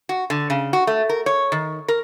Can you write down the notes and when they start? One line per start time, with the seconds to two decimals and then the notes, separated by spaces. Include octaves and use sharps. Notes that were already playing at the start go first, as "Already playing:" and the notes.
0.09 F#4
0.30 D3
0.50 C#3
0.73 F#4
0.87 A3
1.09 A#4
1.26 C#5
1.52 D#3
1.88 A#4